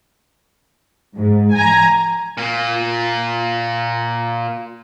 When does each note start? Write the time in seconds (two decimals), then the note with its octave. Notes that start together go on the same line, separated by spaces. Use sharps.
1.16 G#2
1.52 G#5 A#5
2.37 A#2 A#3